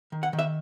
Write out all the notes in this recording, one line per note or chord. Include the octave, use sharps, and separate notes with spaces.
D#3
F#5
D#3
E5